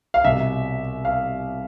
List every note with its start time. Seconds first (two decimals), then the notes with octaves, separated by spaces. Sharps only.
0.14 F5
0.24 C2 B2 E5
1.05 F5